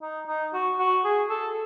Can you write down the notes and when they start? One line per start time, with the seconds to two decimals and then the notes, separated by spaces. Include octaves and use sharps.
0.02 D#4
0.27 D#4
0.53 F#4
0.79 F#4
1.04 G#4
1.29 A4